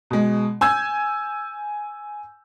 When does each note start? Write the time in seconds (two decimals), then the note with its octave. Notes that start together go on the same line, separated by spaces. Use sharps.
0.11 B2 G#3
0.61 G#5 E6 G6 G#6